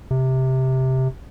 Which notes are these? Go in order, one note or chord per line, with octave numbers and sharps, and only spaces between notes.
C3